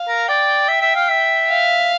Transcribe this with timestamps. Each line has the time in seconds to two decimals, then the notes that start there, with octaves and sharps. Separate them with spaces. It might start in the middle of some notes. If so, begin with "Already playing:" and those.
Already playing: F5
0.08 A#4
0.28 D5 G5
0.69 E5
0.82 E5
0.96 F5
1.09 E5
1.50 F5